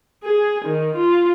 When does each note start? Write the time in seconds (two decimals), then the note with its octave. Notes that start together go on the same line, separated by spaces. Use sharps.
0.24 G#4
0.65 D#3
0.96 F4